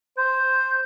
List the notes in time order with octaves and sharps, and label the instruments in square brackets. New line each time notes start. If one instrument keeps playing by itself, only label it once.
[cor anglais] C5 [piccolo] G6